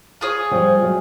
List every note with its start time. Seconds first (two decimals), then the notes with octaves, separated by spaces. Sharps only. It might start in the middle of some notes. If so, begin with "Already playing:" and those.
0.21 F4 G#4 C#5
0.51 F3 G3
0.82 F#3 G#3